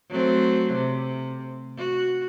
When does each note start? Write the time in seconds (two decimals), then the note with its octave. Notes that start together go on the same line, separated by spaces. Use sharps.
0.10 F#3 A3 C4
0.73 C3
1.78 F#4